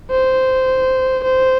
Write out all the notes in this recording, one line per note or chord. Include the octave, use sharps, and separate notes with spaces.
C5
C5